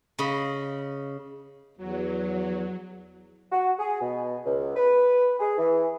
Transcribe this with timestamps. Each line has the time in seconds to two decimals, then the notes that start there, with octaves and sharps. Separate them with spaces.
0.19 C#3 D#5 B5
1.77 E2 F#3
3.52 F#4
3.79 G#4
4.01 B2
4.45 C#2
4.76 B4
5.40 G#4
5.58 E3